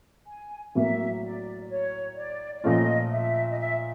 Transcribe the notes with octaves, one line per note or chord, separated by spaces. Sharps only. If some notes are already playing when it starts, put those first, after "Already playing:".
G#5
A2 F#3 A#3 E5
D5
C#5
D5
D5
A#2 F3 A3 C#4 F4 D#5
E5
D#5
E5